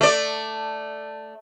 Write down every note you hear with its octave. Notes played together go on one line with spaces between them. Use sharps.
A3 D5